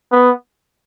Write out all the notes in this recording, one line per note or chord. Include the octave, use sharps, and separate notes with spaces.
B3